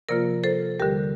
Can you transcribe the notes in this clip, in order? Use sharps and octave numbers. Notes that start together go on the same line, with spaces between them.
C3 F3 A#3 F4 A#4 D5
A4 C5
D#2 D3 G3 G4 A#4